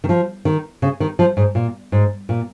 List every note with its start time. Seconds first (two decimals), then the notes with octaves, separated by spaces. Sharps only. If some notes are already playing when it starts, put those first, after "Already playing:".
0.04 D#3
0.09 F3
0.45 D#3
0.82 C#3
1.00 D#3
1.19 F3
1.37 G#2
1.55 A#2
1.92 G#2
2.29 A#2